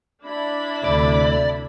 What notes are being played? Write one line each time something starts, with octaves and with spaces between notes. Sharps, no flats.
D4 E4 B5
D2 C3 D5